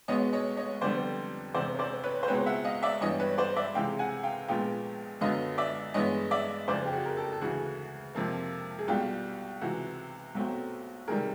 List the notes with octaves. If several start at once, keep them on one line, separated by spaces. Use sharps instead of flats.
B1 B2 G#3 B3 C#5 D#5
C#5 D#5
C#5 D#5
F1 F2 D3 G3 B3 C5 D5
E1 E2 C3 C5 D5
C#5
C5 D5
B4 C#5
C5
C#2 B2 G#3 C4 B4 C#5
E5 F#5
D#5 F5
D5 E5
G2 E3 G3 B3 C#5 D#5
B4 C#5
C5 D5
D5 E5
C#2 C3 E3 G#3 F5 G5
F#5 G#5
F5 G5
A#1 A#2 F3 G#3 B3 F5 G5
F#2 D3 F#3 B3 D#5 F5
D5 E5
G2 E3 G#3 B3 C#5 D#5
D5 E5
F#1 F2 C#3 C5 D5
G4
F#4 G#4
A#4
G4 A4
A4
D2 C#3 E3 A3 F#4 G#4
F2 C3 F3 A#3
G#4
B1 B2 G3 F4 G4
C#2 C3 E3 F#4
B1 B2 F#3 A3 C4
C#2 C3 D#3 G3 G#4 A#4